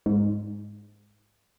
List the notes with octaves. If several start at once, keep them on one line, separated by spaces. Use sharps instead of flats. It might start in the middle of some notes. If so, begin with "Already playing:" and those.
G#2